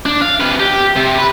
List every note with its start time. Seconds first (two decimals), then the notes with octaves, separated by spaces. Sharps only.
0.06 D4
0.22 F5
0.40 C3 B4
0.60 G4
0.96 C3
1.18 B4